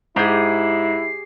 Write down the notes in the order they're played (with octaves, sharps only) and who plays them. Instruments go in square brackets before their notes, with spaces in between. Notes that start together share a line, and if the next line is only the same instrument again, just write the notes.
[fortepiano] G#2 [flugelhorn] E4 [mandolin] G4 G#4 [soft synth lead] C7